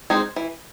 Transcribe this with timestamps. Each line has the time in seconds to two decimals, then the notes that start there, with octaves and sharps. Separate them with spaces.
0.10 G#3 C4 D#4
0.36 E3